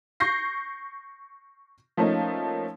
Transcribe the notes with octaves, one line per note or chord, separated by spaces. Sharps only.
C#6 G6 A#6 C7
F3 A3 A#3 C#4 D#4